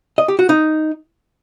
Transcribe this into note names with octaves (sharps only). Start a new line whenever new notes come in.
D#5
G4
F#4
D#4